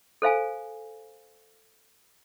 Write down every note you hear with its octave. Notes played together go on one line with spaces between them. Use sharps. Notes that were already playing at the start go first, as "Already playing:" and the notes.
A4 C5 F5 G#5